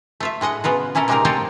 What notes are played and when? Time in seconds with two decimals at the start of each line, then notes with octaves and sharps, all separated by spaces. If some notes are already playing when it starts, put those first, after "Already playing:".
0.20 A3 F4 E5
0.41 A2 G#3 D#5 F#5
0.64 C#3 B3 F4 F#4
0.95 A#2 C#4 E4 A4 A#4
1.08 C3 G#3 A#3 C4 D#4 A#4
1.25 C4 F4 A4 A#4 C5 C#5